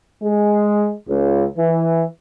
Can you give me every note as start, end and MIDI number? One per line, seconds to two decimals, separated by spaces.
0.22 0.92 56
1.08 1.45 37
1.57 2.04 52